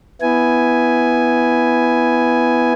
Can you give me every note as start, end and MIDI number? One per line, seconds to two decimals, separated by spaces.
0.22 2.73 59
0.22 2.73 64
0.22 2.73 80